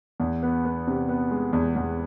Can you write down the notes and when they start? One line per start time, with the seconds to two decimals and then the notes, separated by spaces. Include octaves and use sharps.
0.20 E2
0.43 B3
0.65 B3
0.87 C3
1.09 B3
1.31 G#3
1.53 E2
1.76 E2